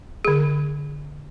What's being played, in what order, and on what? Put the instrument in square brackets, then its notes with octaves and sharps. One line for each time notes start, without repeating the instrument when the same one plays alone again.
[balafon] D3 G#4